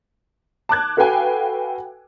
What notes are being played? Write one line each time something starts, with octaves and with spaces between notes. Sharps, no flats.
A5 D6 F#6 G#6
F#4 A4 B4 F5 G5 G#5